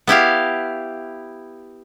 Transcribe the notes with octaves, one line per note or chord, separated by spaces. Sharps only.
B3 E4 G4 F5